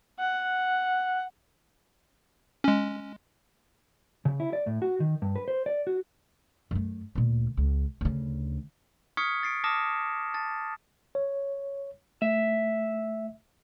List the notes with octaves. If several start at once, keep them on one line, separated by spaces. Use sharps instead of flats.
F#5
G#3 C#4
C#3
E4
D5
A2
F#4
D#3
G2
B4
C5
D5
F#4
F#2 A3
D2 A#2
C#2
D2 C#3
C#6 D#6 F6 G#6 B6 C#7
A6 C7 D7
A5 D6 D#6 F6 A#6 E7
A5 A6
C#5
A3 E5